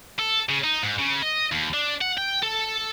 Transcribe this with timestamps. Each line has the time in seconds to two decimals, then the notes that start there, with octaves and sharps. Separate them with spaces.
0.19 A4
0.49 C#3
0.64 D#4
0.83 G#2
0.98 C#3
1.22 D#5
1.52 D#2
1.74 D4
2.01 F#5
2.17 G5
2.43 A4